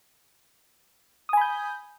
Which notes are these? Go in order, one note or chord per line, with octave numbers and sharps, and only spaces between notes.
G#5 B5 D#6 G6